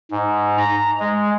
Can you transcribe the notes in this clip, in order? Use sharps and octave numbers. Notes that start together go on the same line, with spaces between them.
G#2
A#5
G#3